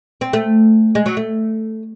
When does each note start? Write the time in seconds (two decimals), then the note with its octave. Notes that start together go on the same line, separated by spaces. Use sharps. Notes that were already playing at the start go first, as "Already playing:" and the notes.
0.21 C4
0.33 A3
0.95 G#3
1.06 F#3
1.17 A3